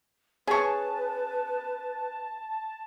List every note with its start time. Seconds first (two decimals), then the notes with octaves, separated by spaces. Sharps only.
0.47 C#4 G#4 B4 A5 C#6